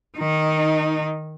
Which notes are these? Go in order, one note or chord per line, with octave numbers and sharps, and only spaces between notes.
D#3 D#4